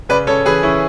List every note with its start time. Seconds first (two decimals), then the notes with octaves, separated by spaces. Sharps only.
0.09 C#3 B4 D5
0.27 C#3 A4 C#5
0.46 E3 G#4 B4
0.63 E3 C#4 E4